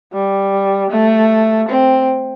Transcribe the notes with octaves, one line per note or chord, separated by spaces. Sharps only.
G3
A3
C4